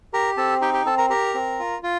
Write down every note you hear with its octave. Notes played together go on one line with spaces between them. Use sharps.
G4 A#4 A#5
C4 A4 A5
D#4 G4 G5
G4 G5
C4 A4 A5
A#4 A#5
G4 A#4 A#5
C4
F4
F4